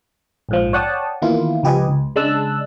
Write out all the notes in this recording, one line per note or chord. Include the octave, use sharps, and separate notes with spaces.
A#1 G#2 F3
C#5 D5 F#5 G5 A5 D#6
D#3 E3 A#3 B3 E4 F4
C#2 F3 G4 B4 D#5 G#5
C#2
C#3 G#3 D4 A5 E6 F#6